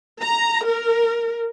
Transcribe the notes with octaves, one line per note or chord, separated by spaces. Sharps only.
A#5
A#4